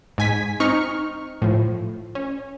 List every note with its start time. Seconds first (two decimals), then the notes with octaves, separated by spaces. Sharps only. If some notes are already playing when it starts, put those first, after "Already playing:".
0.18 G#2 G#5 B6
0.60 C4 D#4 C#6 F6
1.42 A2 F3
2.15 C#4